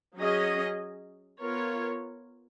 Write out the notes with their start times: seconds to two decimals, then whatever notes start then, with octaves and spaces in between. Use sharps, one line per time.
0.18 F#3 C#4 G#4 D#5
1.42 B3 F4 A#4 C#5